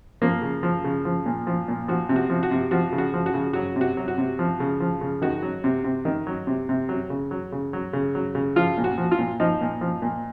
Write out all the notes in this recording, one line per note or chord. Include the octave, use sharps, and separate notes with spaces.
F3 A#3
C#3
F3
C#3
F3
A#2
F3
A#2
F3 F#4
C3
F#4
F3
F#4
C3
F3 F#4
C#3
F#4
F3
F#4
C#3
F#3 F#4
C3
F#4
F#3
F#4
C3
F3
C#3
F3
C#3
D#3 F#4
F#3
C3
C3
D#3
F#3
C3
C3
F#3
C#3
F#3
C#3
F#3
C#3
F#3
C#3
F3 F4
A#2
F#4
F3
F4
A#2
F3 D#4
A#2
F3
A#2